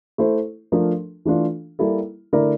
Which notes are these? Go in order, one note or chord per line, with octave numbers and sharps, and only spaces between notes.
A3 E4 A4 C5
F3 A3 D4 F4 A#4
E3 A3 D4 F4
G3 A#3 E4 A4
D3 A3 E4 A#4 D5